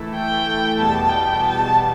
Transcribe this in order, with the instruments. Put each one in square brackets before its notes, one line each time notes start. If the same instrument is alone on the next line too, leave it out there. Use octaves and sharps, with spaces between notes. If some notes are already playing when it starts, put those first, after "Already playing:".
Already playing: [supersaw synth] E3 A3 E4 A4
[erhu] G5
[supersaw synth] E2 B2 G3 B3 [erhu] A5
[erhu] G5
A5